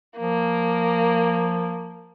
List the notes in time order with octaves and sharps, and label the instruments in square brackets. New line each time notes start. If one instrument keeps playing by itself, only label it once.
[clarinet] F3 [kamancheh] A#3